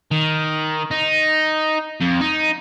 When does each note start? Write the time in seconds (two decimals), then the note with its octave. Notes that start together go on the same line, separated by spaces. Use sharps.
0.11 D#3
0.91 D#4
2.01 F2
2.21 D#4